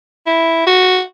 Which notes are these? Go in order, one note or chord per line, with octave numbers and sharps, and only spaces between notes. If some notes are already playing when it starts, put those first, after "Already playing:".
E4
F#4